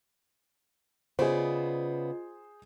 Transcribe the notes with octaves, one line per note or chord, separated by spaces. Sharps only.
C#3 B3 F4 G#4 C5 D5 D#5